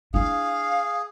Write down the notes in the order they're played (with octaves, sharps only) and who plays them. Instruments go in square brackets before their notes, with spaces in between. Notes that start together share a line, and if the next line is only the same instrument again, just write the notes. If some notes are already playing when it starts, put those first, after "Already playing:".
[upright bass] D4 E4 [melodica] G#4 [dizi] F5